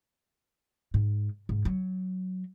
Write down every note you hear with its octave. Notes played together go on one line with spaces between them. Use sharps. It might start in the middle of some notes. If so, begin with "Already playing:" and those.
G#2
G#2
F#3